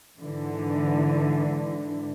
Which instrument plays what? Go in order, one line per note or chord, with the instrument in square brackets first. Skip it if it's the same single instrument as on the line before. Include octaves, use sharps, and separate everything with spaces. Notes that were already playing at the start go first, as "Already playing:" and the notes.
[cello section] G#2 D3 E3